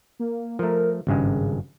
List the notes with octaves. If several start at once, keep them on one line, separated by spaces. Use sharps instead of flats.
A#3
F3 A3 A#4
G#1 G2 C#3 G#3